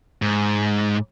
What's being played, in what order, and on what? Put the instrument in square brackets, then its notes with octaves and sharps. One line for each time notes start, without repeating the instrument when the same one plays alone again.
[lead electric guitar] G#2